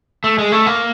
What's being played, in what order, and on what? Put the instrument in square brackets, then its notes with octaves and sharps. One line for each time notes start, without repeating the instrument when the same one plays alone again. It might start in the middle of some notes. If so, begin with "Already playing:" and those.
[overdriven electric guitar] A3
G#3
A3
A#3